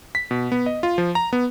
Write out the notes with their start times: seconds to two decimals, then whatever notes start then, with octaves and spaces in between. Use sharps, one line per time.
0.15 B6
0.31 B2
0.52 B3
0.66 D#5
0.83 F4
0.98 F3
1.15 A#5
1.33 B3